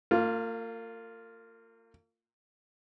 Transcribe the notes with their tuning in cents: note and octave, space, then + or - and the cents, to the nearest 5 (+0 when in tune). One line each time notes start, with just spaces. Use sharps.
A#3 -40 F4 +0